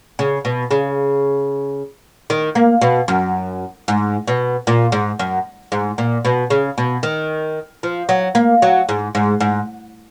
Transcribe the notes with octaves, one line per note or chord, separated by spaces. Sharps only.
C#3
B2
C#3
D#3
A#3
B2
F#2
G#2
B2
A#2
G#2
F#2
G#2
A#2
B2
C#3
B2
D#3
F3
F#3
A#3
F#3
G#2
G#2
G#2